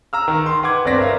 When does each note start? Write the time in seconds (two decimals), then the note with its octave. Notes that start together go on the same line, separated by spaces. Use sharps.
0.13 A#5 E6 F6
0.28 D#3
0.46 C6
0.63 B4 F#5 D6 G#6
0.85 G1 C4 C#5 D5 A#6 B6
0.98 A#4 B4 E5 F5